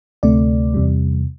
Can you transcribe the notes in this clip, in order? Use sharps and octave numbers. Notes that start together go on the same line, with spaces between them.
D2 C3 A3 D5
E2 C3 G3